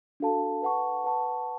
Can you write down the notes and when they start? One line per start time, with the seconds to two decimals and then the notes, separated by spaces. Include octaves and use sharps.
0.20 D4 F#4 A4 F5 A5
0.62 B4 F#5 A5 C#6
1.04 B4 F#5 A5 C#6